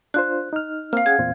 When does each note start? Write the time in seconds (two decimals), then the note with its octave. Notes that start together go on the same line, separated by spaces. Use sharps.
0.14 D4 F4 C5 F#6
0.53 D#4 F6
0.93 A#3 C4 F5 F6
1.06 C#4 G#4 F#5 G#6
1.19 E2 A#2 C4